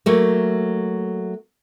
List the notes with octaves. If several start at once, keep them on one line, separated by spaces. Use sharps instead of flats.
F#3 A3 A#3